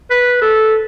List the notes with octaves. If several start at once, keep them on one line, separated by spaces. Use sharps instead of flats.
B4
A4